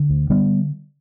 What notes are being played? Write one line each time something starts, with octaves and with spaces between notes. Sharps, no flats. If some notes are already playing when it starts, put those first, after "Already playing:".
Already playing: D3
D2
D3 G3 B3